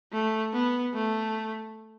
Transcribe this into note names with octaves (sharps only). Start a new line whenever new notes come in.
A3
B3
A3